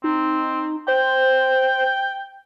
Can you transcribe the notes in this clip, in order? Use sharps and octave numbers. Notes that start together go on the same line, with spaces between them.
C4 D#4
C5 G5